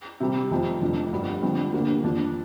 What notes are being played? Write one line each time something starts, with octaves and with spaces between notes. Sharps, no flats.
C3 G3 C4 G4
F1 F2 F3 C4
F1 F2 F3 D4
G1 G2 G3
G1 G2 D3 F3 C4
D2 D3 A#3 G4
F2 F3 D4